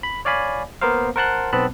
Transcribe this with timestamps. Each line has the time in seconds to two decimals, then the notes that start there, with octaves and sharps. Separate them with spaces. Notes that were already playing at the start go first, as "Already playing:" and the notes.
0.03 B5
0.25 C#5 D5 F5 G#5 B5
0.81 A#3 B3 A#4 C5 F5
1.16 A#4 C5 F#5 A5 C6 F#6
1.53 B1 B3 C4 A5 B5 F#6